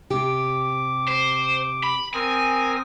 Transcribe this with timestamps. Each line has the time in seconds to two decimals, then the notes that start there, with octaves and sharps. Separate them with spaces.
0.10 C3 G4 D6
1.08 C5
1.83 B5
2.14 C4 A#4 G#5 D#6